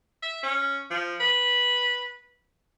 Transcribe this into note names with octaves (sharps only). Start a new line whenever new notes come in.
E5
C#4
F3
B4